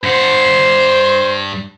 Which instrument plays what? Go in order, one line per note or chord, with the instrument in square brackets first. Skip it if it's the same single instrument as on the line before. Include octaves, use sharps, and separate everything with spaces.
[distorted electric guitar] G2 F#5 [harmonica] C5